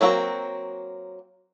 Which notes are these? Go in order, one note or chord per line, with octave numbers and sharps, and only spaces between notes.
F#3 A#3 C4 D#4 F#4